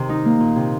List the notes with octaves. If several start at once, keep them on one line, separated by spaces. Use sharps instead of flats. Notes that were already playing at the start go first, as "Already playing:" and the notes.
Already playing: C3 D#3
D#4
A#3
A#2
C3